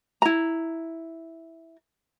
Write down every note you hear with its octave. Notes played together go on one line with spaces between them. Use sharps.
E4 A#5